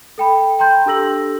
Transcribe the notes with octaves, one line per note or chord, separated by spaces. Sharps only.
A4 G5 B5
G5 A#5 C6 G6
D4 G4 A4 E6 A#6 F#7